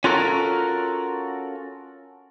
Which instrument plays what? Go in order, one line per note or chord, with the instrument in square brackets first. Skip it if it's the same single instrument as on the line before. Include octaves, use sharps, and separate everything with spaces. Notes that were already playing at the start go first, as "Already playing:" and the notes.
[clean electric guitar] C#4 F4 F#4 A4 A#4